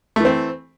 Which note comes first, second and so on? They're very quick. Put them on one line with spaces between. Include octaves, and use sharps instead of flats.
A3 E3 C4